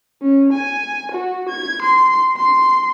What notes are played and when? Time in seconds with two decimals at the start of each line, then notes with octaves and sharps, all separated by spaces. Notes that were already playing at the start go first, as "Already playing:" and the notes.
0.22 C#4
0.53 G#5
1.12 F#4
1.49 G#6
1.82 C6
2.37 C6